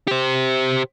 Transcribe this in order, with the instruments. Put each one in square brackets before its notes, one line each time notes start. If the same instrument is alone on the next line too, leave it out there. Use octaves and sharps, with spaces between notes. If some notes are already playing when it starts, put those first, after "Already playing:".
[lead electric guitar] G4 C5